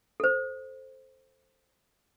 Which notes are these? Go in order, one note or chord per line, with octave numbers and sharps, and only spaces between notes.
A4 C5